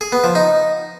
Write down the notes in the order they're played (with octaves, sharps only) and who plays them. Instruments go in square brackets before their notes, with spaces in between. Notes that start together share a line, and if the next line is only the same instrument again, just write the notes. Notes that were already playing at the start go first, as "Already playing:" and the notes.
[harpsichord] G#4
B3
F3
D#4